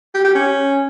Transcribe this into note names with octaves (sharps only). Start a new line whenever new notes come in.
G4
G4
C#4